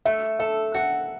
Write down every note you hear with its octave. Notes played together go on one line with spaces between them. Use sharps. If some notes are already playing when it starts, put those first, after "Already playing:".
A3 E5
A4 E5
F#4 F#5